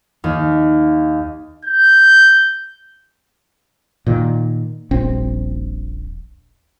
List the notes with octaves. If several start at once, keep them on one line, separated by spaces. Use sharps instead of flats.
D#2
G6
A#2 D#3
D#1 A#1 C4